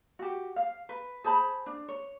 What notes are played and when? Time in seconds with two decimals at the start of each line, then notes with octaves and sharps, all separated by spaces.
0.19 F#4 G4
0.56 F5
0.89 B4
1.24 G#4 C5 A5 B5
1.66 D4
1.88 C#5